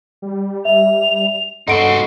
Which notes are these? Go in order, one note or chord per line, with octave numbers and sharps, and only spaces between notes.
G3
E5 F7
G2 D#4 F#4 A4 F#5 C6 D7